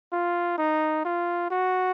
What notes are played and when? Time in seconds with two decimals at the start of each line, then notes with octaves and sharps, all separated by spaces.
0.12 F4
0.58 D#4
1.05 F4
1.51 F#4